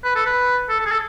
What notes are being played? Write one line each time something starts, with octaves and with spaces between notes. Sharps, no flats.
B4
A4
B4
A4
A4
G#4
A4